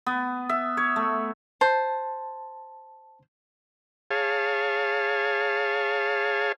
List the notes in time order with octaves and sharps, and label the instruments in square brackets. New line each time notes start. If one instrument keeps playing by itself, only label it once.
[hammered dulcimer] B3
E5
C#5
A3
[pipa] C5 [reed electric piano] A5
[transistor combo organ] G#4 C#5 F5 A5